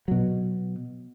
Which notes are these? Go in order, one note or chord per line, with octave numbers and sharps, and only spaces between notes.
B2 F#3